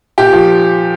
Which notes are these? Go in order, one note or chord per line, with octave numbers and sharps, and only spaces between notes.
A#2 G4
F3